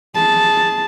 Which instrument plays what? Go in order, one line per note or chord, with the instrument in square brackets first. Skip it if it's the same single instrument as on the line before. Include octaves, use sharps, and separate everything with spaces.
[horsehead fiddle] G#4 A5